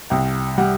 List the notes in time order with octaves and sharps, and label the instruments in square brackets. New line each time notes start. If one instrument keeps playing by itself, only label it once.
[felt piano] C2 G5
G3 F#5